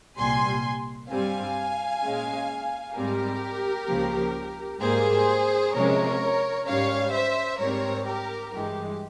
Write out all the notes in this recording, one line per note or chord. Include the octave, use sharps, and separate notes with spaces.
C2 A#2 G3 G#5 C6
G2 G3 C4 F5 G#5
A#2 G#3 C#4
G#2 G3 C4 G4 A#4
C#2 C#3 F3 A#3
G#2 G3 A#3 G#4 C5
C3 F3 G#3 C#4 A#4 C#5
G#2 G3 C#4 C#5 F5
C5 E5
G#2 G3 C4 A#4 C#5
G4 A#4
G2 E3 G#3 G4